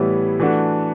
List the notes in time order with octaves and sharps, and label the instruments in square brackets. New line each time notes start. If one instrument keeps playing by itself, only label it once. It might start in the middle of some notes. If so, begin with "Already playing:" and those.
Already playing: [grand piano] A2 E3 G3 B3 E4
E3 A3 D4 F#4